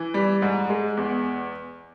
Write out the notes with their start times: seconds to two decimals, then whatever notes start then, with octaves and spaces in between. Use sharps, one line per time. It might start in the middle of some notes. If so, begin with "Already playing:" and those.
Already playing: E3
0.14 G3
0.42 G#2
0.70 G#3
0.97 E2